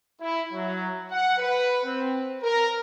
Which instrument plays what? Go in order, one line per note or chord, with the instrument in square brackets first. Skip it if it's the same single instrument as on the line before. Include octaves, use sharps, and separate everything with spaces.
[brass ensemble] E4
F#3
F#5
B4
C4
A#4